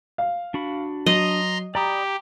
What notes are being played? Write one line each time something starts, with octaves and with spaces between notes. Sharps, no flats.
F5
D4 F#4 B5
F#3 D#5 A#5 C6
G4 D5 A#5 B5 D#6